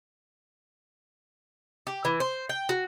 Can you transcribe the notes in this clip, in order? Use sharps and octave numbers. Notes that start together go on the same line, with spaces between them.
G4
E3
C5
G5
F#4